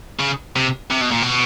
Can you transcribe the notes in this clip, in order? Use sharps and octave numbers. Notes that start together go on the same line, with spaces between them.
C#3
C3
C3
B2
A#2
B2